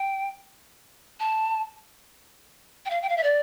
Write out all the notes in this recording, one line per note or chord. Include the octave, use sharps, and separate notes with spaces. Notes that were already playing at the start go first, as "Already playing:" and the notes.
Already playing: G5
A5
G5
F5
G5
F5
E5
D5